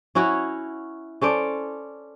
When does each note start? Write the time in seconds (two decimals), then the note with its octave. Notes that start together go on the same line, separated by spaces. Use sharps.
0.15 C#4 E4 F#4 C#5
1.21 C#4 A4 C5 D5